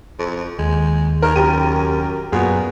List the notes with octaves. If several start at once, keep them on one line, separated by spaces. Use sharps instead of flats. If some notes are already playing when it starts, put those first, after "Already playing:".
F2
D#2 G#3
D#3 A#4
F#2 G4 A#4 D#7
F#2 A#2 B3 F#4 G#4